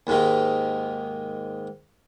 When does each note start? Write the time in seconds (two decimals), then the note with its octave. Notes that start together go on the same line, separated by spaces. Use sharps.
0.07 D#2 G#2 D#3